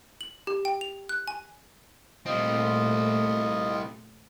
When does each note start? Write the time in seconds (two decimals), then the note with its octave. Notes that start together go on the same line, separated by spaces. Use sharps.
0.21 F#7
0.47 G4
0.65 G5
0.81 F7
1.09 F#6
1.28 G#5
2.26 A#2 G3 A3 C4 F4 D#5